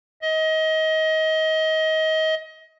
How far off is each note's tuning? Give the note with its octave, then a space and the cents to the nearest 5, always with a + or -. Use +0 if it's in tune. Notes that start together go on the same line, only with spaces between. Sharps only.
D#5 +25